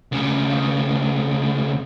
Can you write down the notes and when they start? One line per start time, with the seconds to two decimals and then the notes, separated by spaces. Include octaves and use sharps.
0.12 D2 C#3